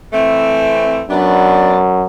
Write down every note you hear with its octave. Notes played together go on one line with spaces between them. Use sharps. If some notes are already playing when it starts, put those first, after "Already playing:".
E3 A3 C4
F#2 B3 D4